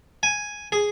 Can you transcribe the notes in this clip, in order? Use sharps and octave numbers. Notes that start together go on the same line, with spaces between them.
G#5
G#4